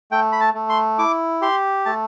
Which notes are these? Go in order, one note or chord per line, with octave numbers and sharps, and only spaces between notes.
A3 G5
B5
A5
A3
C6
E4 D6
G4 C6
A3 A5